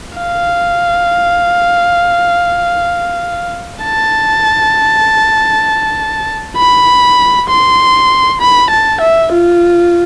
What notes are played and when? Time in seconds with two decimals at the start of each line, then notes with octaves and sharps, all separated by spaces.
0.18 F5
3.84 A5
6.57 B5
7.49 C6
8.41 B5
8.70 A5
9.01 E5
9.33 F4